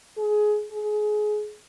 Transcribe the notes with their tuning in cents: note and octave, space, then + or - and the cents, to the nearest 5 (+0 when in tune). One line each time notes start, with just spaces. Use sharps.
G#4 +20
G#4 +25